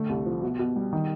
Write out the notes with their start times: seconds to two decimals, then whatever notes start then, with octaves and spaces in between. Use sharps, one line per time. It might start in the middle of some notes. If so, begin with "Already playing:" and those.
Already playing: D3 A3
0.09 C2
0.26 F3
0.43 B2
0.59 B2
0.76 G3
0.93 D#3